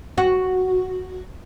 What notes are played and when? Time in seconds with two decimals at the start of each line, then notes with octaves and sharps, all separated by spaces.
0.18 F#4